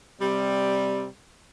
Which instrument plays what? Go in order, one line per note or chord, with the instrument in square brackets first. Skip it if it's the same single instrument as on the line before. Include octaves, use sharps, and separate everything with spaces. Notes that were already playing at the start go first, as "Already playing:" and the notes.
[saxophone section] C3 G3